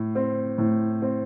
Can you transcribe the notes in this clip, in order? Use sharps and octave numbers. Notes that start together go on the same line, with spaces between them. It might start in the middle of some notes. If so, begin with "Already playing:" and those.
Already playing: A2
C4
A2
C4